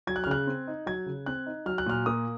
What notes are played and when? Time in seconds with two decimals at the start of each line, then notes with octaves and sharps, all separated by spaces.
0.07 F#3 G#6
0.16 F#6
0.24 F6
0.27 C#3 F#6
0.47 C4
0.68 D#4
0.86 F#3 G#6
1.06 C#3
1.26 C4 F#6
1.46 D#4
1.66 F#3 F6
1.78 F#6
1.86 A#2 F6
2.06 A#3 D#6